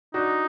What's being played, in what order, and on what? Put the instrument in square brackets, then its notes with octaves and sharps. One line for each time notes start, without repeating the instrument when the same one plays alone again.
[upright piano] D4 F#4 [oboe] D#4